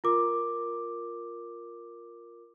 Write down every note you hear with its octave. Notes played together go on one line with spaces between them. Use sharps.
F4 A#4 D6